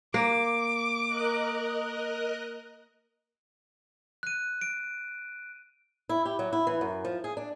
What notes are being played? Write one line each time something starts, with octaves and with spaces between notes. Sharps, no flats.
A#3 D6
A#4 D#5 F#6
F#6 D#7
D7
E4
G4
F#3
E4
E3
F#2
F3
G#4
D4